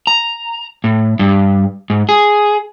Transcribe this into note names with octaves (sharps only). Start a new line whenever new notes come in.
A#5
A2
G2
G#2
G#4